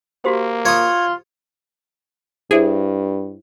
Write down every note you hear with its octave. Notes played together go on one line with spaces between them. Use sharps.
A#3 F#4 G4 C5
F4 C#5 D#6
G2 E4 G#4 C5 E5